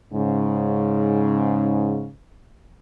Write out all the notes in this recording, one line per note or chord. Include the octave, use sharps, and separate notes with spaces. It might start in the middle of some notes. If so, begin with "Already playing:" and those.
G#2 C#3